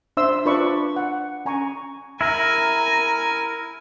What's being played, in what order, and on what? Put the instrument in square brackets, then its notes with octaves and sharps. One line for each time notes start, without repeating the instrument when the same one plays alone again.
[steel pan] D4 C5 E5 C6 E6
D4 F4 B4 D5 B5 C#6
F#5
C#4 G#5 A#5 C#6
[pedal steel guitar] E4 A#4 [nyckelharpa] G#5 [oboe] A#5